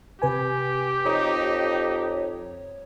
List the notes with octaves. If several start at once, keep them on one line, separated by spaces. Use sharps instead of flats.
C3 G4 B4 G#5
F2 D#4 C#5